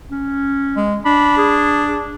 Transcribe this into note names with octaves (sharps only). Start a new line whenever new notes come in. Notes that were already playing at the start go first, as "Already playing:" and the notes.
C#4
G#3
D4 B5
G#4